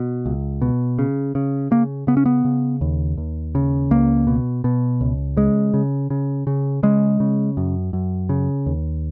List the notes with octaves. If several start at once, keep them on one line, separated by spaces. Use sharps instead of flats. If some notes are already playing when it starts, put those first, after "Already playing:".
Already playing: B2
C#2
B2
C#3
C#3
C#3 A#3
C#3 B3
C#4
B3
C#3
D#2
D#2
C#3
C#2 A#3
B2
B2
C#2
C#3 G#3
C#3
C#3
C#3
C#3 G#3
C#3
F#2
F#2
C#3
D#2